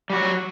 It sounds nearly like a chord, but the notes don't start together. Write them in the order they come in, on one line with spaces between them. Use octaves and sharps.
G3 F#4 F#3